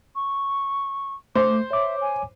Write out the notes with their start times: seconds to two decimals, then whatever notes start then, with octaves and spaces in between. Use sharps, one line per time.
0.15 C#6
1.35 A3 C5 D6
1.71 C#5 E5 D6
2.01 G#5